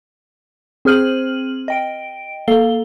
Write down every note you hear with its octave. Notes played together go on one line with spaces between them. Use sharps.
C4 G#4 C5 F6 D#7 F#7
D#5 G5 D7
A#3 A4 F5 G7